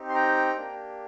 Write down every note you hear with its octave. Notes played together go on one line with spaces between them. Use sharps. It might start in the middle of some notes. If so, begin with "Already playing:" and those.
Already playing: C4 D#4 G4
C6
G5 A#5
A#3 D4 G4